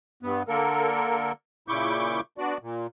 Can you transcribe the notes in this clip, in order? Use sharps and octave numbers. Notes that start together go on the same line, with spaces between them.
G2 B3
D3 A#3 A4 A#4
A#2 C#3 E4 C#6 D6 G6
B3 D4 F#4 D5
A#2